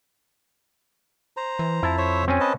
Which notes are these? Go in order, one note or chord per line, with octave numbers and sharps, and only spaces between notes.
C5 A#5
E3
F2 E4 A5
C5 C#5 E5
C4 C#4 G#5
B4 D#5 A5